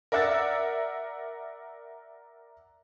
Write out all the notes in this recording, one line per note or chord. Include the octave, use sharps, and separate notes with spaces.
A#4 D5 E5 F#5 E6 A6